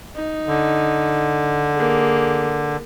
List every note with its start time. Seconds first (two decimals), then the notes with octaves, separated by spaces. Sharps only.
0.16 D#4
0.47 D3
1.75 A#3 G#4